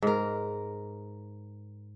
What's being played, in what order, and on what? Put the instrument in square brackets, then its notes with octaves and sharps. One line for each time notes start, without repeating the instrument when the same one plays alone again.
[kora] G#2 A#4